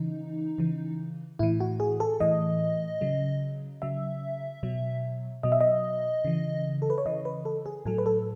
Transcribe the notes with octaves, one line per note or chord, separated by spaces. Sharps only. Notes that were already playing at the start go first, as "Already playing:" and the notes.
Already playing: C#3 E3 D#4
C#3 E3
A2 E3 E4
F#4
G#4
A4
A2 E3 D#5
C#3 F#3
C#3 F#3 E5
B2 F#3
B2 F#3 D#5
E5
D#5
C#3 E3
A4
B4
C#5
C#3 E3 D#5
B4
A4
G#4
A2 F#3 A4
B4
A4